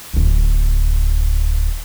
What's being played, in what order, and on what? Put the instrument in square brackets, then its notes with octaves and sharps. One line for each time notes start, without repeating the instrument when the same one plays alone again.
[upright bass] D1 D2